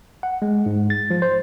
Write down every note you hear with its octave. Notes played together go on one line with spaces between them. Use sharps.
F#5
G#3
G#2
A6
F3
C5